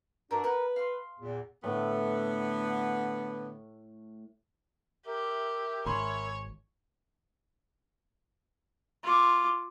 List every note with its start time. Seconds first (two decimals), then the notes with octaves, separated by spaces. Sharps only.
0.31 G2 D4 F#4 A#4 E5
0.44 A#4 B4 F#5 B5
0.76 F5 C6
1.20 E2 A#2
1.64 A2 D3 B3
5.07 G4 A#4 E5
5.86 G#1 C#5 G#5 B5 C6
9.03 F4 D6